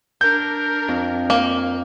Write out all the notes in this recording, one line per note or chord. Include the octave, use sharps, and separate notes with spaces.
D4 A#4 G6
F2
A#3